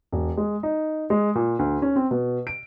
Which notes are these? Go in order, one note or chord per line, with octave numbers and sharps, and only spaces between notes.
E1
G#3
D#4
G#3
A#2
D2
C#4
C4
B2
D7